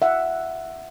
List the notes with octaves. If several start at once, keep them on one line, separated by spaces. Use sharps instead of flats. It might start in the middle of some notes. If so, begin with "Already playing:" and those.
E5 F#5